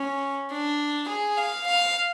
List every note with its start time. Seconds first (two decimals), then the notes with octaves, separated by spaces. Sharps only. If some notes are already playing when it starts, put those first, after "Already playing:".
Already playing: C#4
0.51 D4
1.08 G#4
1.37 F5
1.66 F5